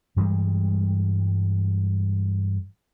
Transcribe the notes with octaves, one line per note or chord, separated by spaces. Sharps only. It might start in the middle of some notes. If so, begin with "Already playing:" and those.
G2 E3 G3 G#3